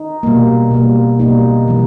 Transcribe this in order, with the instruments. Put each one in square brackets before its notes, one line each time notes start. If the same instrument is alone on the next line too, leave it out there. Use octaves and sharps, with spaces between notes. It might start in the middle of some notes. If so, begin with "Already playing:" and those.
Already playing: [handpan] D#4
B2 G3 A#3
B2 G3 A#3
B2 G3 A#3 D#4
C3 E3 G3